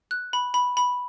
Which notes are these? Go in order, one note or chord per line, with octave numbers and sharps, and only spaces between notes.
F#6
B5
B5
B5